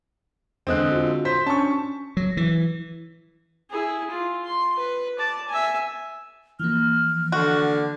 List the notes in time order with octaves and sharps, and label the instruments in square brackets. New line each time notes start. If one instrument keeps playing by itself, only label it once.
[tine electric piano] E2 D#6 F#6 [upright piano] D3 G#3 C4
[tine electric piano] F4 F#4
[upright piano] C5 B6
[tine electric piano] C#4 D4 [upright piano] A5 C#6
[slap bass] F#3
E3
[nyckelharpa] E4 G#4
F4
C6
B4
D5 A5
E5 G#5
[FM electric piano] E3 F3 A#3 [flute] F6
[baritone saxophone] D3 [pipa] F#4